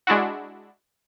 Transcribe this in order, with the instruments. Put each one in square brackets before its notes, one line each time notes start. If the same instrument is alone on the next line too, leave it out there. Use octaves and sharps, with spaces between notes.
[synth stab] G#3 D4 E4 F#4